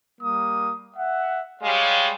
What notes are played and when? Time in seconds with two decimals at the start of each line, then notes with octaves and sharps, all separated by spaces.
0.21 G3 A#3 D#6
0.96 E5 F#5
1.62 G3 G#3 C#5 F5